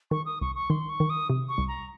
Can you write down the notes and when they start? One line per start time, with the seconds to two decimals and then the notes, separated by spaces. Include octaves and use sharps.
0.11 D#3 C#6
0.26 D#6
0.41 C2 C#6
0.55 C#6
0.70 D#3 C6
0.89 C#6
1.00 D#3
1.10 D#6
1.30 C3
1.49 C#6
1.58 C2
1.68 A#5